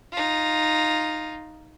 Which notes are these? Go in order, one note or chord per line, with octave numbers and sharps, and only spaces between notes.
D#4 F4